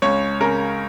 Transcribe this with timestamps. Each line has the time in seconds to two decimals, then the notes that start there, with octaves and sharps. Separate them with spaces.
0.02 C#2 C#5
0.41 C#3 A#4